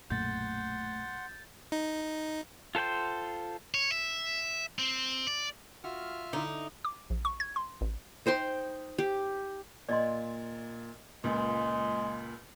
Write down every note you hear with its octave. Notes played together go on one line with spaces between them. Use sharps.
B1 F#2 A#2 A3 F#5 C6 G6 A6
D#4
F4 A4 C5 G5 C6
C#5
E5
C4
D5
F4 F#4 E5 F6
D3 D#4 E4
D6
A#1
C#6
G#6
C6
A1
D#4 C5 G5 C6
G4
A#2 D5 D#5 C6
C#2 A#2 G#3